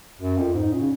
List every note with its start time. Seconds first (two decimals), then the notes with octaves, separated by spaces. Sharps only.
0.20 F#2 F#4
0.38 F2 F4
0.54 G#2 D#4
0.72 A#2 C#4
0.81 C#3